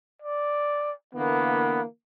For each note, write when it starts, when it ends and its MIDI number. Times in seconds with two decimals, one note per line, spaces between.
0.22 0.92 74
1.15 1.84 50
1.15 1.84 52
1.15 1.84 58
1.15 1.81 59